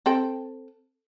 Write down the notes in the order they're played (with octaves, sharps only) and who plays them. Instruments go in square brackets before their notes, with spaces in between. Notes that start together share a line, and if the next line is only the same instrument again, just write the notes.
[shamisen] C4 A4 G5